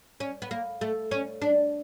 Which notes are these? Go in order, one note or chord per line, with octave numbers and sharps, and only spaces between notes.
C#4
B3
A#3
A3
C#4
D4